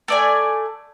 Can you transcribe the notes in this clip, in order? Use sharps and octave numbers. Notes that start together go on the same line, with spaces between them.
A3 D5 G#5